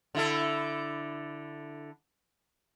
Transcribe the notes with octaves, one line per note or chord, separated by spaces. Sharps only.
D3 E4 A4